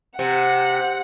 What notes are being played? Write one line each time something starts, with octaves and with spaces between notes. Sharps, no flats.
C3 F#5